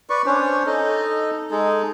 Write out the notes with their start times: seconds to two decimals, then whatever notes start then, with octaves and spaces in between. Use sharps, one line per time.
0.10 B4 D5 C#6
0.26 C#4 D4 C5 C#5
0.66 D#4 A4 D#5
1.51 G#3 D#4 G#4 A4